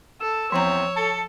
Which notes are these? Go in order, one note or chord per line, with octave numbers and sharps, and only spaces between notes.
A4 E6
E2 F3 C4 C#5 A#5
A4